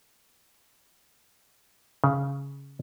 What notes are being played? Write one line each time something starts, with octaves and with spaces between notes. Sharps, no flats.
C#3